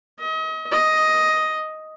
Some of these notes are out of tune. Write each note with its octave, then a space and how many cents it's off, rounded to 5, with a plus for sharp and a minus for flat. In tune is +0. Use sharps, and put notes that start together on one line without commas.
D#5 +35
D#5 +5